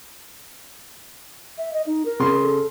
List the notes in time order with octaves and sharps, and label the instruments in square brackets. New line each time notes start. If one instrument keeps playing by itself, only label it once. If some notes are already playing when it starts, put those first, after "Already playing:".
[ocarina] E5
D#5
D#4
A#4
[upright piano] C#3 C6
[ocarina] A4